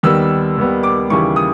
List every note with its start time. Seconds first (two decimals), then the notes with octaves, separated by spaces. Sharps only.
0.03 D#2 D#3 G3 B3 E6
0.57 D#2 D#3 G3 B3
0.83 D6
1.10 D#2 C#3 E3 G3 C#6
1.36 D#6